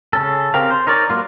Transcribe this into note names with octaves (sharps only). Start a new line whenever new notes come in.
C#3 C#4 A4
C#3 C4 G4 A#4 F5
C5
D#4 A#4 C#5 D5
F#3 G3 A#3 F4